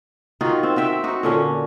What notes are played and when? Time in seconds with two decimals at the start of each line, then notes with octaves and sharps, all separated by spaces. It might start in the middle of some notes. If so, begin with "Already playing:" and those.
0.41 D#3 D#4 F4 F#4
0.63 C4
0.76 C4 F#4 E5 G5
1.04 D#4 F#4
1.23 A#2 D3 C#4